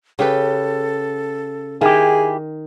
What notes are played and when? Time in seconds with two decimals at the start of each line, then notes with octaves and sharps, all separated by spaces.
0.19 C#3 G4 A4 B4
1.81 D#3 E4 G4 G#4